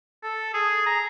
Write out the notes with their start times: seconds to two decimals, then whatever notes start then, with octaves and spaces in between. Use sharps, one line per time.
0.23 A4
0.54 G#4
0.86 A#5